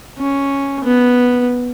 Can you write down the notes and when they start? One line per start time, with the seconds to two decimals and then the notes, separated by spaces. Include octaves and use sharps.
0.18 C#4
0.84 B3